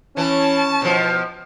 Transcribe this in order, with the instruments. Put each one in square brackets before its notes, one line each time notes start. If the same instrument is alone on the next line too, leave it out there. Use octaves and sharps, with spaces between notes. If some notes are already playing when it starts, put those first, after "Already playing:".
[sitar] E3 [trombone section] C#4 [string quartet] A5
[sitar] B2 F3